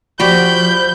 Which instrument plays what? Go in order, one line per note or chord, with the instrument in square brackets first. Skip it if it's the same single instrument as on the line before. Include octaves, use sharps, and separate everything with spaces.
[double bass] F3 [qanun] F#4 G4 D5 [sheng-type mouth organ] B5 [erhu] G6